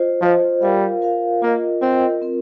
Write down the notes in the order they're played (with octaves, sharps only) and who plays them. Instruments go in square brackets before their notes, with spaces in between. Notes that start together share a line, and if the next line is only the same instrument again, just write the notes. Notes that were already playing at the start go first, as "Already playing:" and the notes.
Already playing: [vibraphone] F4 C5 D#5
[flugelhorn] F3 [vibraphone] F4 C5 D#5
[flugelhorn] G3 [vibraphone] F4 A#4 F5
[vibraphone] F4 A#4 F5
[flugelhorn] A#3 [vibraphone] F4 A#4 D#5
[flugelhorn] C4 [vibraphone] F4 A#4 D#5
[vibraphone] C4 F4 A#4